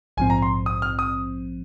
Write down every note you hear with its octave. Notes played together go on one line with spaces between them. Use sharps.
A#1 G#2 F3 C4 G#5
A#5
C6
D#6
F6
D#6